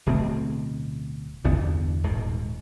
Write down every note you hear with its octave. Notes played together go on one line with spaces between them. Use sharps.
D1 B2 A3 C4
G1 E2 E3 B3
D#1 G#2 B2